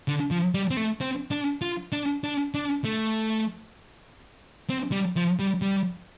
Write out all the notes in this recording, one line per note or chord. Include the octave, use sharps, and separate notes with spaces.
D3
F3
G3
C4
A3
C4
D4
F4
D4
D4
D4
A3
C4
G3
F3
G3
G3